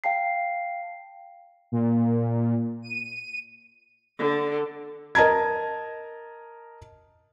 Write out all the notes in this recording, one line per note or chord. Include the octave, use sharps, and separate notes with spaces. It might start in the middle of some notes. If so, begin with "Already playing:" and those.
F5 G5 A5 C7
A#2
D#7
D3
A#4 D#5 A5 A#5 G#6